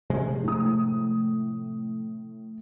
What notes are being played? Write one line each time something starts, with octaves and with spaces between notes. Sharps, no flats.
C3 F3 G#3
A2 D#6